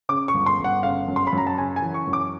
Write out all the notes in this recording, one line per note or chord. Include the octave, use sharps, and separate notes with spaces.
C#3 D6
C#6
G1
C6
G1
F#5
C#3 F5
F#2
C6
B5
F#2
A#5
A5
C#3 G#5
G#5
E3
C#6
F#2
D6